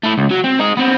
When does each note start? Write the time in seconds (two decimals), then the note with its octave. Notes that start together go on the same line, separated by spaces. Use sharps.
0.04 A3 E4
0.18 C#2
0.31 F#3
0.44 C4
0.59 D#4 G#4
0.77 B3 C4